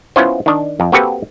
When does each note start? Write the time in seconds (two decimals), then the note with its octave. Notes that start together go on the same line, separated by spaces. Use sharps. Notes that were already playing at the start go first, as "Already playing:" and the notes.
0.16 B3 C#4 E4 F4 C5
0.46 D#3 D4
0.80 F2
0.92 A#3 C4 F#4 G4 A4 B4